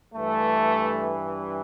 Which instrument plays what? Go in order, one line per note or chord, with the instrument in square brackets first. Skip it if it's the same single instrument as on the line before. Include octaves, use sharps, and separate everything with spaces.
[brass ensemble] G2 E3 A3